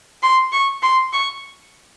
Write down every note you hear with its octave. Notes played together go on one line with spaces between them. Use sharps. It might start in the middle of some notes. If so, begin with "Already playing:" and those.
C6
C#6
C6
C#6